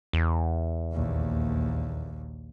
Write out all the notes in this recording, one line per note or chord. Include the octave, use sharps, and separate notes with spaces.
E2
A#1 D#2